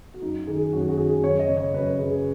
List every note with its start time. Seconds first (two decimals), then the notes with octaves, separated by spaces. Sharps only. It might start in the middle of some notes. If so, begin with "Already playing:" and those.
0.14 F#4
0.22 F#2 D#4
0.47 D#3 G#4
0.73 F#2 F#4
0.81 G#4
0.89 F#4
0.97 D#3 G#4
1.23 F#2 C#5
1.39 D#5
1.48 C#3
1.57 C#5
1.74 F#2 B4
1.89 B4
1.99 C#3 G#4